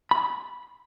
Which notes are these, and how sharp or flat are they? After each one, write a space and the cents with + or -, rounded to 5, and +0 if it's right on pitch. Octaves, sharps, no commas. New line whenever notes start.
B5 -10